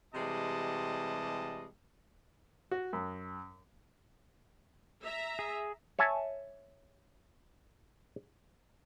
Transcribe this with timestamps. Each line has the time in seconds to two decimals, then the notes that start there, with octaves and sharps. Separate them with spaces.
0.14 C3 E3 G3 G#3 D#5 A5
2.71 F#4
2.93 F#2
5.03 E5 A#5
5.39 G#4
5.99 C#5 E5 G#5 A5